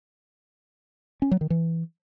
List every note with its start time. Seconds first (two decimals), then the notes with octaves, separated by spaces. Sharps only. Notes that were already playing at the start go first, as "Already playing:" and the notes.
1.22 C#4
1.31 F#3
1.41 D#3
1.50 E3